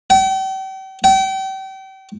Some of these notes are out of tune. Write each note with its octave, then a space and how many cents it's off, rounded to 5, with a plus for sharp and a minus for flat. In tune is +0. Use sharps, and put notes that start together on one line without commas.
G5 -40
G5 -35